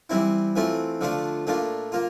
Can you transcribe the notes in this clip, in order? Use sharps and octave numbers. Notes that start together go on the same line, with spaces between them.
E3 G3 C4 E4
E3 A3 C4 F4
D3 F3 A3 D4 F4
A#2 A3 D4 F4
A#3 F4